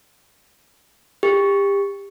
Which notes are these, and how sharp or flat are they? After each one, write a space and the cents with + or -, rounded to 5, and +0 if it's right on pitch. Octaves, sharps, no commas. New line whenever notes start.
G4 +30